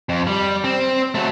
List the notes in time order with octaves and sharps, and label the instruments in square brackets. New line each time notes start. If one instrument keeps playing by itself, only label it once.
[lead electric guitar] F2
G3
C4
F#3 A3